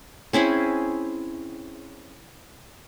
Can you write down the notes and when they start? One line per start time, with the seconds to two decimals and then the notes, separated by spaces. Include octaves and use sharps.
0.33 C4 C#4 E4 G#4